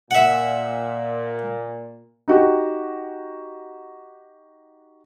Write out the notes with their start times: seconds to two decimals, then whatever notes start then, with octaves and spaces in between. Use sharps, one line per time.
0.11 A#2 E5 F#5
2.28 D#4 F#4 G4